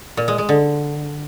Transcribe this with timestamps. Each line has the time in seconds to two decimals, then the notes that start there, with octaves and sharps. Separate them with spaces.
0.17 A#2
0.28 G#3
0.38 G#3
0.49 D3